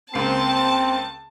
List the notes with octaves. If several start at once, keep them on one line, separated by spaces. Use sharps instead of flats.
C#2 A#3 C4 A5 C7